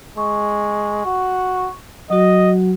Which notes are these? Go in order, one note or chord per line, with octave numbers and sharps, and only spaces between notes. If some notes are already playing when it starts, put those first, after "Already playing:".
G#3 C#6
F#4
F#3 F#4 D#5